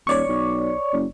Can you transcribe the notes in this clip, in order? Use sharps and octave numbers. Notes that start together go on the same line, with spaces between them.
D#1 C#5 D5 C#6
B1
F#1